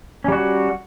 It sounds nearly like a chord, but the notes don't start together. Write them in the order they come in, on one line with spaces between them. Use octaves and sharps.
C#4 G3 F#4